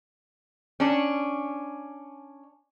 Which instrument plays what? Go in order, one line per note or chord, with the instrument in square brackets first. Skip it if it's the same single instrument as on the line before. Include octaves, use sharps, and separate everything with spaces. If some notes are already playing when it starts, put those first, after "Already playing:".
[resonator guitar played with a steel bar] C#4 D4